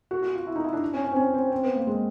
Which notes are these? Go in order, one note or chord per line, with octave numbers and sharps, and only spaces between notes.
F#4
F#4
F4
E4
D#4
E4
D4
C#4
C#4
C4
C#4
C4
C4
B3
A#3
G#3